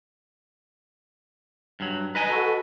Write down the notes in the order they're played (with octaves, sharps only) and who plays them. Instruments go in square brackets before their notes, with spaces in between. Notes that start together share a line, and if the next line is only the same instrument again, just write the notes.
[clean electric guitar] G2 F#3
[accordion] D#4 A#5 [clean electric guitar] B4 D#5 G#5
[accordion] F#4 A4